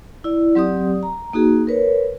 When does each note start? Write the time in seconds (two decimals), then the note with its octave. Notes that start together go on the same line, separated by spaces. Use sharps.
0.24 E4 D5
0.55 F#3 C4 G4 D5 D#6
1.03 A#5
1.33 A#3 D#4 F#4 G#4
1.67 A#4 B4 C#5